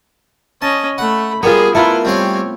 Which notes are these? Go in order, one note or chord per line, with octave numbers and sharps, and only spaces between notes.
C#4 D#5 A5
A3 F#5 B5
G3 A#3 B3 F4 G#4
A3 E4 F4 A#4 B4
G3 C4 C#4 C#5 F5